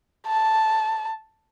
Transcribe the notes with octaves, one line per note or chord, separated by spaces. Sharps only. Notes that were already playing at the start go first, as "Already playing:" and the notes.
A5